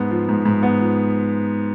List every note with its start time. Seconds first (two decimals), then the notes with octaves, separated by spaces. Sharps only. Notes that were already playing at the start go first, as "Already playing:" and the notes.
Already playing: G#2 B3
0.11 F3
0.29 G#2
0.45 G#2
0.63 B3
0.81 F3